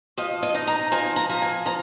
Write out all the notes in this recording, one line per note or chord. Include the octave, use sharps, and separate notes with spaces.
F3 D#5
D#5
D#4
A#5
F3 G#5
A#5
F3
G#5
F3 A#5